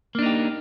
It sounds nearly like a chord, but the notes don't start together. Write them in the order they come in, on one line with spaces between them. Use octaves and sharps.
A#3 D4 D#4 G4